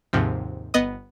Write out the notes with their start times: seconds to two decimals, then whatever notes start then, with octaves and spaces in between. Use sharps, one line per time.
0.13 D#2 G#2 C3 F3
0.74 G1 B3 D#5 D#6